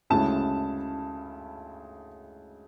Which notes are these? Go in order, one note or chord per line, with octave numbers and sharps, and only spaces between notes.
D2 C#3 G#3 C#4 E4 A5